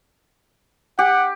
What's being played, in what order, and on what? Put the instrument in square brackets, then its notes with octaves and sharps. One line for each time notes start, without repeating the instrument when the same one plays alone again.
[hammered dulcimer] G4 [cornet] F#5